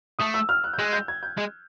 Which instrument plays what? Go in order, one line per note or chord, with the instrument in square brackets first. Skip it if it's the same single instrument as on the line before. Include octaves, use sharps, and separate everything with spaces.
[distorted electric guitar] A3 [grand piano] D#6
[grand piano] E6
F6
F#6
G6
[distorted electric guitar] G#3 [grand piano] F#6
[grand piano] G6
G#6
G6
[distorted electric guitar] G#3